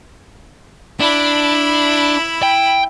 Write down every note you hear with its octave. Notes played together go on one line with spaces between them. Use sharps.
D4 E4 B5
G5